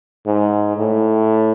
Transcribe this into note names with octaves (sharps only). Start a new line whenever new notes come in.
G#2
A2